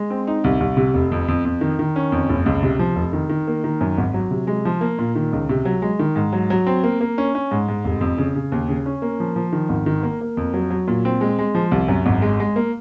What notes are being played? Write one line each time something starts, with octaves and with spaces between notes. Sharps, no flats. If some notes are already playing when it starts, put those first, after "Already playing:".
Already playing: G#3
C4
D#4
C2
C2
C3
F1
F2
F2
F2
D#3
D#3
C#4
F2
F#1
C#2
C3
F3
F1
D#3
D#3
A#3
D#3
F#2
G#1
F#3
C3
G#3
F3
A#3
A#2
D#3
C#2
C3
F#3
G#3
D#3
G#2
F#3
F#3
C4
A#3
A#3
C#4
C#4
G#2
G#2
F1
F2
C#3
C#3
D#2
C#3
C#4
A#3
F3
F3
D#3
G#1
D#3
A#3
A#3
F2
F#3
F#3
A#2
C4
G#3
G#3
F3
C2
F#2
G#1
G#3
G#3
A#3